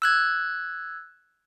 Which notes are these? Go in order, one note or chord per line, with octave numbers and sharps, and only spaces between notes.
E6 F#6 G#6